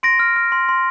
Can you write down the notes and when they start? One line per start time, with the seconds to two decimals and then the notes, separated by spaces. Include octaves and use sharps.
0.03 C6 A#6 D7
0.19 F6
0.36 F6
0.52 C6
0.69 C6